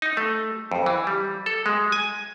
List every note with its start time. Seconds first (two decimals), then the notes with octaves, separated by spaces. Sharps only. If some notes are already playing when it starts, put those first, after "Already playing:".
0.02 D#4
0.17 A3
0.72 F2
0.86 E3
1.07 G3
1.46 A4
1.66 G#3
1.92 G#5